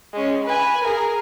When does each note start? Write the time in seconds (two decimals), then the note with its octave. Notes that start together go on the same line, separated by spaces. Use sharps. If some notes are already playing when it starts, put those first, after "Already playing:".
0.13 G#3 C#4
0.45 B4 G#5
0.84 G#4 A#4